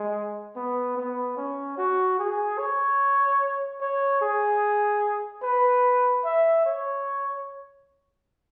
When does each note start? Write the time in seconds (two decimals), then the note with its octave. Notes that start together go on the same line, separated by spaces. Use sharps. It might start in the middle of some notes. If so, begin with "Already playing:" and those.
Already playing: G#3
0.56 B3
0.97 B3
1.37 C#4
1.78 F#4
2.19 G#4
2.59 C#5
3.81 C#5
4.22 G#4
5.43 B4
6.25 E5
6.66 C#5